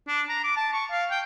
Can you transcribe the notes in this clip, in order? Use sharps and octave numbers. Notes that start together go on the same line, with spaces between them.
D4
A#5
D6
A5
C#6
F5
G5